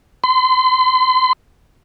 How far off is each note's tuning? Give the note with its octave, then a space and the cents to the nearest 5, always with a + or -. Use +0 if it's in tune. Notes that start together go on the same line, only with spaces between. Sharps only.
C6 -35